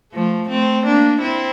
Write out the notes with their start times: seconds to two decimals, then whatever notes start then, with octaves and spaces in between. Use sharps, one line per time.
0.13 F3 A3
0.49 A3 C4
0.85 A#3 D4
1.21 C4 E4